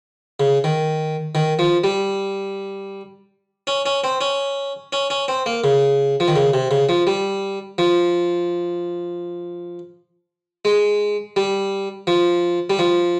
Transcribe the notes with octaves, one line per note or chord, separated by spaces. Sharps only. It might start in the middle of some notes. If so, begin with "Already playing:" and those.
C#3
D#3
D#3
F3
G3
C#4
C#4
C4
C#4
C#4
C#4
C4
A#3
C#3
F3
D#3
C#3
C3
C#3
F3
G3
F3
G#3
G3
F3
G3
F3